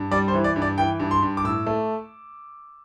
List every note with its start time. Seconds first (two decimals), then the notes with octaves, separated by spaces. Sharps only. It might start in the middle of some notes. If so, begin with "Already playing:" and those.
Already playing: G2
0.11 G3 D5
0.28 C5
0.34 E3
0.44 D5
0.56 G2
0.62 D5
0.78 E3 G5
1.00 G2
1.11 C6
1.23 G2
1.37 D6
1.44 A2 E6
1.67 A3